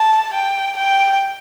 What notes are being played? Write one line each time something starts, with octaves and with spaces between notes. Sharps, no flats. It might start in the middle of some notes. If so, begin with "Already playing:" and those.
Already playing: A5
G5
G5